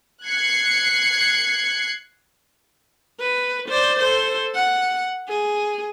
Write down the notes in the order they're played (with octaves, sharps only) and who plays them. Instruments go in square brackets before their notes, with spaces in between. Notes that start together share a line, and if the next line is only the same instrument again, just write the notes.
[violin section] F#6 G#6 C7 C#7
[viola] B4
C5 D5
A4 C5
F#5
G#4